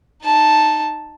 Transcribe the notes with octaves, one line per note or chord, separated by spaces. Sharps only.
D#4 A5